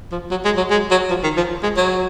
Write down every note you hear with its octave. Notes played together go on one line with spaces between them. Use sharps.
F3
F#3
G#3
F#3
G#3
F#3
F3
D#3
F3
G#3
F#3